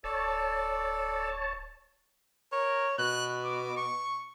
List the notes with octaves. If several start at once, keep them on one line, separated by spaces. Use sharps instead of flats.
D1 A4 C#5 D5 A5
A#4 C#5
B2 F#6
D6
C#6